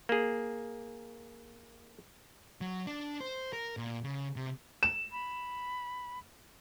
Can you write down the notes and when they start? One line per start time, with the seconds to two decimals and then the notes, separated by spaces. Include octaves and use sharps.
0.09 A#3 G#4
2.61 F#3
2.87 D4
3.20 C5
3.53 A#4
3.77 A#2
4.04 C#3
4.36 C3
4.83 E7
5.12 B5